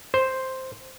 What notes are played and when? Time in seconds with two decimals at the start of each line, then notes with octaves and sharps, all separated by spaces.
0.14 C5